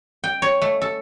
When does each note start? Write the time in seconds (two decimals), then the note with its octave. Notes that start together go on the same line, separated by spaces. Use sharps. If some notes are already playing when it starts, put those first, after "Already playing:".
0.24 G5
0.42 C#5
0.62 A3
0.82 A4